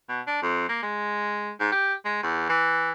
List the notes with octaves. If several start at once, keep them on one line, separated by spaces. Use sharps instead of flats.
B2
D4
F2
A#3
G#3
G#2
G4
G#3
E2
E3